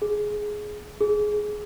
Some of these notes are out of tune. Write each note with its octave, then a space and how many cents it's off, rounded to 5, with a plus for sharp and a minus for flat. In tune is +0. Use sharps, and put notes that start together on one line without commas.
G#4 +10
G#4 +15